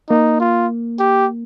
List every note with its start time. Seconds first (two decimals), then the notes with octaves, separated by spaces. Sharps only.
0.09 A#3 D#4
0.40 F4
1.00 G4